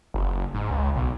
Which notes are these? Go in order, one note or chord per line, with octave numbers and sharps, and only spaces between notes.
F#1
G#2
C#2
B1